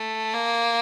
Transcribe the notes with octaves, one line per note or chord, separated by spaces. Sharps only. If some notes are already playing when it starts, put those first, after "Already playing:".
Already playing: A3
A#3